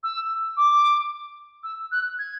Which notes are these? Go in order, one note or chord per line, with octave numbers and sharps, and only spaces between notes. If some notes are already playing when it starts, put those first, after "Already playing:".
E6
D6
E6
F#6
G#6